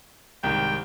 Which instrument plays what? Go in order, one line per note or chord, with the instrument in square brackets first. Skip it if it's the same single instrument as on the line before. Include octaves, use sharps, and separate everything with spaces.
[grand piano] C2 G#2 D#3 [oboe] G5